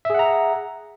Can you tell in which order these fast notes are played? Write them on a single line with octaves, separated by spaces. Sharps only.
E5 G#4 F#5 A#5